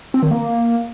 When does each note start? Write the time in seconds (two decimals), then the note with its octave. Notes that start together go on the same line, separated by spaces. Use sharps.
0.14 C4
0.23 D#3
0.31 A#3